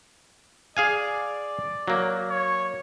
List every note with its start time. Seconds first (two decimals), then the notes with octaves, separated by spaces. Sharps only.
0.77 G#4 D5 F5 G#5
1.88 F#3 A#3
2.30 C#5